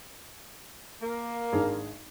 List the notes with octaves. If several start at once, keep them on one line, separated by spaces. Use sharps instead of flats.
A#3
G#1 D4 G#4